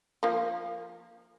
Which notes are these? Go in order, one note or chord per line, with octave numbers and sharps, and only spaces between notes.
F3 A#3